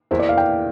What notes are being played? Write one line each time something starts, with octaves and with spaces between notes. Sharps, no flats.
E2 E3 A#3 E4 C5
D5
F5
G5